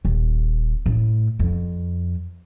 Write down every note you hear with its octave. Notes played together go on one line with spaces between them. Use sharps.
D#1
A2
F2